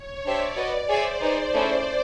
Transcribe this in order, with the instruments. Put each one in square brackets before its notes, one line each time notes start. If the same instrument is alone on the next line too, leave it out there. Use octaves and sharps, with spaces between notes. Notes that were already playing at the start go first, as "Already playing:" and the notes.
Already playing: [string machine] C#5
[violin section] D4 G4 C5 E5 [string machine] D5
[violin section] F#4 B4 D#5
[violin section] G#4 C#5 E5 G#5 [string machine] C5
[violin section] D#4 G#4 B4
A3 C#4 E4 G#4